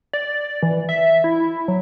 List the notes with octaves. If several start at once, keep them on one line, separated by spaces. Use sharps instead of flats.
D5
E3
E5
E4
F#3